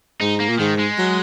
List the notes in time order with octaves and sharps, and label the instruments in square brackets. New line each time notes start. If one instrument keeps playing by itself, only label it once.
[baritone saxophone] G#2 [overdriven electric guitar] D#4
[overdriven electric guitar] A#3
[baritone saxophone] A#2
[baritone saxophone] G#2 [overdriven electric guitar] D#3
[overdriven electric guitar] G#3
[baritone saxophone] F#3